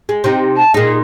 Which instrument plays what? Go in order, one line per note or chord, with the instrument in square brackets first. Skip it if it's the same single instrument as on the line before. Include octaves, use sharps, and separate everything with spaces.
[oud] G#3
C3 D#4
[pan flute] A5
[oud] A#2 D#4 [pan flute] G#4